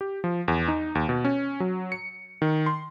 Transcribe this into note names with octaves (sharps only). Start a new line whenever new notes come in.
G4
F3
E2
D#4
D#2
B2
C#4
F#3
C#7
D#3
C6